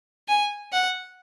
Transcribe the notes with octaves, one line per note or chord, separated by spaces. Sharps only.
G#5
F#5